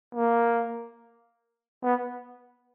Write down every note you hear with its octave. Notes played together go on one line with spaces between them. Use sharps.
A#3
B3